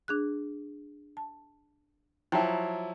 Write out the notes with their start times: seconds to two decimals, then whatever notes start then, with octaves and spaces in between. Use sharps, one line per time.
0.08 D4 G#4 F#6
1.17 A5
2.32 F3 F#3 E4 G5 A5 A#5